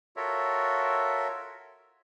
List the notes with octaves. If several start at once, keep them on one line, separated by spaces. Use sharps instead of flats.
F4 F#4 A4 A#4 C#5 E5